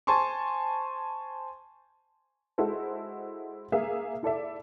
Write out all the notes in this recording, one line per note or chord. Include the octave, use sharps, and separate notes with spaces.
C5 G#5 A5 C6 C#6
G#3 E4 F#4 A4 C5
A#3 G#4 E5 F5
E4 A4 D5 E5